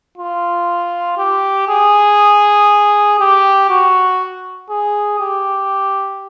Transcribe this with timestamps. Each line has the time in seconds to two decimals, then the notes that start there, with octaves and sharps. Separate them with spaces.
0.18 F4
1.18 G4
1.68 G#4
3.19 G4
3.70 F#4
4.70 G#4
5.20 G4